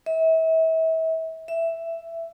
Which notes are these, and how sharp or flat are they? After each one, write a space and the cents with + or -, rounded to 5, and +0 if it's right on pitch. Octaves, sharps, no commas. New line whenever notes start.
E5 -35
E5 +5